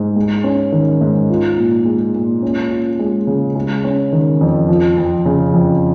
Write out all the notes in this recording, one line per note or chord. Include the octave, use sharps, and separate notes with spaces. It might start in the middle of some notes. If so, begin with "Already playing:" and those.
Already playing: G#2
G#3
C#4
D#3
G#2
F4
A#2
G#3
A#2
C#4
F4
G#3
C#3
G#3
C#4
D#3
F2
F3
F2
C#3
F2